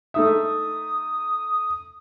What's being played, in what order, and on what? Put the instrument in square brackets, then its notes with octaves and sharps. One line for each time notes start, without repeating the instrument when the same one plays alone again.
[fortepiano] A3 D#4 E5 [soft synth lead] D#6